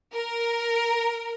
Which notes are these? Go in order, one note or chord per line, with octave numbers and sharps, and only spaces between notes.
A#4